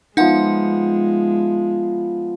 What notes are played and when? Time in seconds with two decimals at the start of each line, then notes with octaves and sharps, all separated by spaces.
0.17 F3 G#3 B3 D#4 E5 F#5